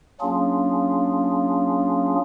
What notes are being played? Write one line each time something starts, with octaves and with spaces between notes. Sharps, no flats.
F#3 A#3 C#4 D4 F4 G#4